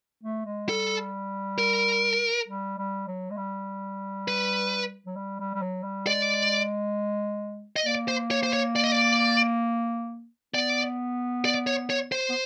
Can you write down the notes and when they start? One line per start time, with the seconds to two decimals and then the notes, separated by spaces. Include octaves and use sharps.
0.24 A3
0.46 G#3
0.69 G3 A4
1.58 A#4
2.48 G3
2.78 G3
3.08 F#3
3.31 G#3
3.37 G3
4.28 B4
5.07 F#3
5.16 G3
5.40 G3
5.55 G3
5.62 F#3
5.84 G3
6.07 G#3 D5
7.76 D#5
7.86 A#3 D5
8.08 C5
8.31 C#5
8.43 C5
8.53 C#5
8.76 D5
8.84 D#5
8.92 D5
10.54 B3 D5
11.45 D5
11.67 C#5
11.90 C#5
12.12 C5
12.29 B3